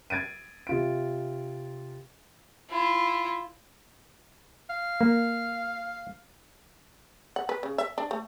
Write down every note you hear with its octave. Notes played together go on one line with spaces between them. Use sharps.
G#6 A6 D7 D#7
C3 F4 D7
E4 F4
F5
A#3
F#5
B4
C#3
E5
D4
A3